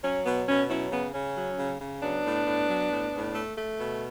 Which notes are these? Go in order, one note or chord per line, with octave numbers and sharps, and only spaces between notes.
F#3 C#4
B2 B3
B2 C#4
F#3 C#4 E4
C#3 B3
C#3 C#4
F#3
C#3
C#3
F#3 B3 D4
A2
A2
F#3
A2
A2
A3
A3
B2